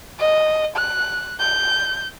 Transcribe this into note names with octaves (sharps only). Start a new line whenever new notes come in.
D#5
F#6
G6